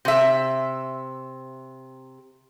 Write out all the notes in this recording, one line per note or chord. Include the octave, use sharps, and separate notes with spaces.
C3 E5